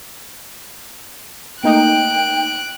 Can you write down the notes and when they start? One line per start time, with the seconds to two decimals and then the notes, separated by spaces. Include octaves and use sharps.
1.63 A3 A#3 D#4 G5 F#6 D7